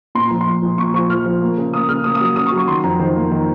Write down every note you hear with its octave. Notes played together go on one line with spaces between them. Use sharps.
A#2 C6
A#1 A#5
C6
A#1
A#1
A#2 C#6
F3 C#6
A#1 F6
F3
A#3
C#3
A#3 D#6
C#3 F6
A#3 D#6
D#6
F#3
C#3 D#6
C#6
F#3
C#6
D#3 C6
F2 A#5
D#3 C5
A#3
D#3